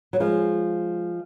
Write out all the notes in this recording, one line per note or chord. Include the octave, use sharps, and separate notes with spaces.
F#3
F3 G#3